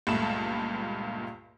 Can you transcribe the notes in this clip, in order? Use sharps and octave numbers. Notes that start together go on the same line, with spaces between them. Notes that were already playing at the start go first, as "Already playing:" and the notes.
C#2 G2 A#2 A3 B5 E7